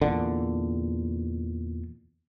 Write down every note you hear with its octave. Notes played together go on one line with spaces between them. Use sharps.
E2 A#2 D3